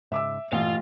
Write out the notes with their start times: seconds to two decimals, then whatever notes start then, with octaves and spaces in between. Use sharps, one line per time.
0.12 G#2 C#3 E5 D6 E6
0.52 A1 G2 A#2 E3 F4 F5